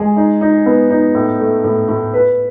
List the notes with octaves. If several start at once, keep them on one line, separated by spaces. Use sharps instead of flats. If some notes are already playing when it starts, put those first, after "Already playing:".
Already playing: G#3 G#4
D#4
D#4
B3
D#4
A2
A3
A2
A2
B4